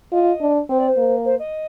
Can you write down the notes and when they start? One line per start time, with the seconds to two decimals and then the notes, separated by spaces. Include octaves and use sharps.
0.12 F4 D#5
0.41 D4
0.69 C4 C5
0.78 D5
0.88 C5
0.97 A#3
1.25 C5
1.39 D#5